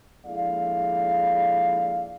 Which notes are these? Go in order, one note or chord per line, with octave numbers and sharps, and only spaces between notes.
A#1 G#3 E4 A4 D5 F5